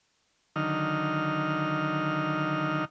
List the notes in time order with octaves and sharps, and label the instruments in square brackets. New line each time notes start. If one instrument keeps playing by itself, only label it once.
[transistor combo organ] D3 D#3 F#3 D#4 F6